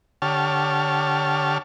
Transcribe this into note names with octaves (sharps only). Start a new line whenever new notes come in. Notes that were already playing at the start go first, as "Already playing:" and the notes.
D3 G4 C#5 A5 F6